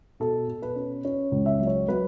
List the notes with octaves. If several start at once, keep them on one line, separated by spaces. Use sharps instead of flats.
B2 A4
B2
B4
C#4
C#4
C#2
E5
F#3
C#5
F#3 B4